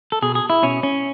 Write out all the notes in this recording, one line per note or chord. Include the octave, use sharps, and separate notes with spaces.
A4
B2 G#4
G#4
E4
B2 C#4
C#4